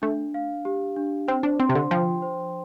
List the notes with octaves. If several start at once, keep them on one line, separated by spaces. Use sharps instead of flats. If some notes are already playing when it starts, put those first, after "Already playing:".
A3 D4
F5
G4
D4
C4 C5
D4
C4 C6
C3
D3
F3 G5
C5